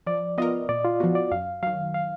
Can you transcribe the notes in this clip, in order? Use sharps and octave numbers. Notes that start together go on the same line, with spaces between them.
F3 D5
B3 F4 A#4 D#5
A#2 D5
F4
F3 B3 F#4
D5
F#2 F5
D#3 F#3 F5
F5